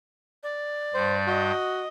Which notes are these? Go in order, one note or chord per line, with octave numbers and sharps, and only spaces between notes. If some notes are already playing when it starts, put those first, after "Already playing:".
D5
G2 G3 C5 G6
F#4 D#5